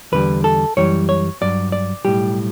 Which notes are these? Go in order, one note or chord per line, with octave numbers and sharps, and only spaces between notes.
E2 D3 G3 B4
A4
F#2 E3 G3 C#5
C#5
G2 F#3 D5
D5
B1 A2 E3 G3 G4